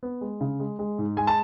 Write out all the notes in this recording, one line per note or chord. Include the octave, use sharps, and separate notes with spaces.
B3
G#3
C#3
G#3
G#3
G#2
G#3 G#5
A5